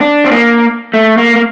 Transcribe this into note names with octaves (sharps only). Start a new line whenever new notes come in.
D4
C4
A#3
A3
A#3
A#3